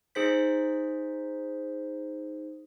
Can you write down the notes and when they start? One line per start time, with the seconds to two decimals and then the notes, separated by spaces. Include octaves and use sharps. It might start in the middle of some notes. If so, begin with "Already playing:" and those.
0.15 D#4 G#4 C5 B6